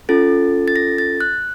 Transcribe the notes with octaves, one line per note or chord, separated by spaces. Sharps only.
C#4 F4 A4 A6
A6
A#6
A6
F#6